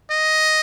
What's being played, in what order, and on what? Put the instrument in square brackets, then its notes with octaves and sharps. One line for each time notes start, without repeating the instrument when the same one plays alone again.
[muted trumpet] D#5